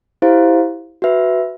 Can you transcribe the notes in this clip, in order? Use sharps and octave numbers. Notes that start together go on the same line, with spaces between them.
E4 G4 C5 F5
F#4 B4 E5